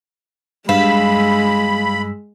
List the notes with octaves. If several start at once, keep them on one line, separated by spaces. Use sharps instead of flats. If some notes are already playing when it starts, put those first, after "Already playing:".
G2 G#3 F5 B5 E6 B6